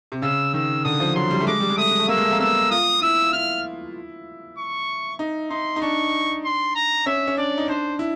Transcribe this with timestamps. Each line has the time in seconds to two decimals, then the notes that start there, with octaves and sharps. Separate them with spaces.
0.12 C3
0.22 C#3 E6
0.53 D#3 E6
0.84 D3 D#6
1.00 F3
1.15 F#3 C6
1.30 G3
1.40 A3
1.47 G#3 D6
1.60 G3
1.69 G#3
1.77 A3 D#6
1.91 G#3
2.00 A3
2.08 A#3 E6
2.17 G#3
2.25 A3
2.32 A#3
2.39 B3 E6
2.71 F4 D#6
3.02 E4 E6
3.33 E4 F6
4.58 C#6
5.19 D#4
5.50 D#4 C6
5.76 D#4
5.82 D4 C#6
6.44 C6
6.75 A#5
7.06 C#4 E5
7.27 C#4
7.37 D4 D5
7.58 D#4
7.68 D4 C5
7.99 E4